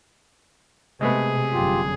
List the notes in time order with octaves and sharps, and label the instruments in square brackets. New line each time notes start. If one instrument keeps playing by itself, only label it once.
[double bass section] C3 [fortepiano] G#3 A3 B3 [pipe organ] G#4
[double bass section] G1 F#2 [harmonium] F4 G4